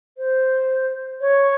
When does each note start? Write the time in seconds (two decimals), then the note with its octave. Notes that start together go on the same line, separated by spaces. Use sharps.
0.18 C5
1.21 C#5